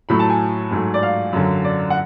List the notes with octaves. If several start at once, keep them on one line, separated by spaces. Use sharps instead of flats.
A2 F#3 A3 B5
A5
G#5
G#2 F#3 A3
D5
F5
F#2 D3 F#3
D5
F#5